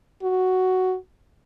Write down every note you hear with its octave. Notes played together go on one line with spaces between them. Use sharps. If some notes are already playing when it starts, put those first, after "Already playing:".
F#4